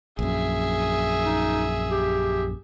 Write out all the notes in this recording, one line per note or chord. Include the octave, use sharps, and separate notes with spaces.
A#1 F#2 G#4 E5
D#4
G4